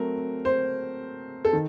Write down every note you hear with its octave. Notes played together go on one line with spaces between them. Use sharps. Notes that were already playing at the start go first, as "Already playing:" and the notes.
Already playing: F#3 A3 C4 A#4
C5
A4
D#3